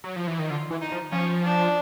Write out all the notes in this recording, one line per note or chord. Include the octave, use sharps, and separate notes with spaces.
F#3
F3
E3
D#3
D3 F4
E3
D#4
F3
F3 C#4
D4